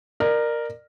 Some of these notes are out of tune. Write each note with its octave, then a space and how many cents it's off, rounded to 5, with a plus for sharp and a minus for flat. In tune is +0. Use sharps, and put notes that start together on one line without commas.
A#4 +0 D5 +35